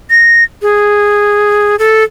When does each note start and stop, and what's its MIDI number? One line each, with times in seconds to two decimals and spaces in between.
0.10 0.44 94
0.62 1.76 68
1.79 2.04 69